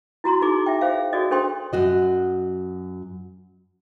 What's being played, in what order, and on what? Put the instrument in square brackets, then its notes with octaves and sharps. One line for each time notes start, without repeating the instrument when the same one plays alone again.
[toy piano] E4 F#4 A#5 C6
D#4 F#4 G#4 D6
E5 G5
G#4 C5 F5
F#4 G#4 A4 D5 D#5
D4 A4 C5 G5 C6
[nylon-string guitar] F#2 F#4 D#5